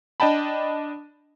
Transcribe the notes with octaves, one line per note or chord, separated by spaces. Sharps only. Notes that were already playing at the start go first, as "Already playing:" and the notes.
D4 D#5 G5 A5 B5